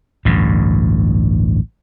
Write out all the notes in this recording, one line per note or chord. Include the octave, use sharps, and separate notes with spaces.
A1 D2 G2